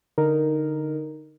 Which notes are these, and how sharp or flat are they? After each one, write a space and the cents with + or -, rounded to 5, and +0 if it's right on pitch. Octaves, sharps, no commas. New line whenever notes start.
D3 +0 D#4 -5 A#4 +0